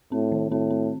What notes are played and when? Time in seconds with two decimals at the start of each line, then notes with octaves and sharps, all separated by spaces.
0.12 A2 C4
0.32 D#3
0.51 A2 C4
0.70 C4